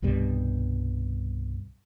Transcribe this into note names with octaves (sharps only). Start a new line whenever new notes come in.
C2 G2 B2 G3